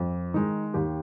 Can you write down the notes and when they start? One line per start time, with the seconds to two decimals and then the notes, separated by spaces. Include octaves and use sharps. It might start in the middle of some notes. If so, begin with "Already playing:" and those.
Already playing: F2
0.34 D#3 G#3 D#4
0.74 D#2 G4